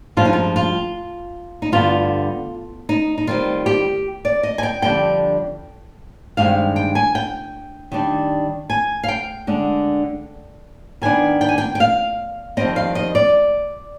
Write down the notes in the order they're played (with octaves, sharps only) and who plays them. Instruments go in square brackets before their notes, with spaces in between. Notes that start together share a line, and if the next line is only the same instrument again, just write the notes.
[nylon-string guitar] G2 F3 G#3 D4 F4
D#4
F4
F4
D#4
G2 D3 G3 B3 F4
D#4
D#4
D#3 G3 C4 F4
G4
D5
D#5
G#5
G5
F2 D3 G3 D4 G5
G2 D#3 G#3 C4 F5
G5
G#5
G5
D#3 G3 D4
G#5
F5
G5
D3 G#3 D4
D#3 B3 D4 G#5
G5
G#5
G5
G5
F5
F2 D#3 G3 C4 D#5
F5
D#5
D5